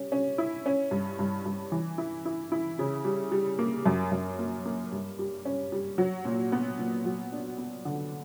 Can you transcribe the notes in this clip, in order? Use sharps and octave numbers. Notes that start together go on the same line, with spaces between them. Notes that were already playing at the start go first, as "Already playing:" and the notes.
Already playing: G3 C#4
C#4
E4
C#4
G2
G2
G2
E3
E4
E4
E4
C#3
G3
G3
A#3
F#2
F#2
A#3
A#3
G2
G3
C#4
G3
F#3
A#2
B3
A#2
F#3
D4
B3
D3